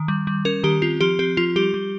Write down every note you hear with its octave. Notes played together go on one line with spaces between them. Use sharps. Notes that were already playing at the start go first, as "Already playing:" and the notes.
Already playing: D#3
G3
G3
C#4 A#4
D#3 G4
C4 F4
F3 G4
C4 G4
F3 F4
G3 G4
G3